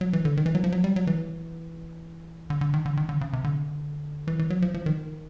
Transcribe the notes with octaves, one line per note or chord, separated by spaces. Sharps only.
F#3
E3
D3
D#3
E3
F#3
F3
F#3
G3
F#3
E3
D3
D3
D#3
D3
D#3
D3
C#3
C3
D3
E3
E3
F#3
F3
F3
D#3